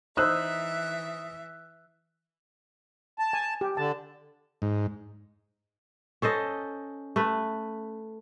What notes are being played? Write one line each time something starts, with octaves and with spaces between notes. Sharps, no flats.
E3 D#4 C5 E5 D#6 E6 F#6
A5
G#5
G4
D3 A5
G#2
C#4 A4 C5 D#5
A3 B4